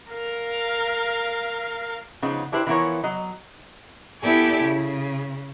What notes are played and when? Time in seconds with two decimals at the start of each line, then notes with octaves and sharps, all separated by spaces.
0.11 A#4 F5
2.22 C#3 F3 B3 D#4
2.52 D4 E4 G4 B4 C5
2.67 E3 F3 B3 E4 A#4 C#5
3.04 F#3 D#5
4.21 B3 E4 G4 A4 D5 G#5
4.62 C#3